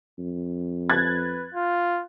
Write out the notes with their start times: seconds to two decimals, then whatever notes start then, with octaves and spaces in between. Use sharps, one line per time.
0.19 F2
0.90 B4 F#6 G#6 A6
1.54 F4